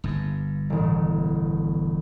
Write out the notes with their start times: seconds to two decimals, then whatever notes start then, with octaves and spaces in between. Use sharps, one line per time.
0.04 G1 G2
0.70 E1 A1